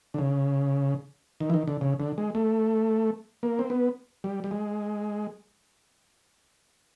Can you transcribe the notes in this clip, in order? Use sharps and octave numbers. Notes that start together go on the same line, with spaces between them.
D3
C#3
D#3
E3
D#3
D3
C#3
D3
G#3
A3
A#3
C4
B3
G3
G3
G#3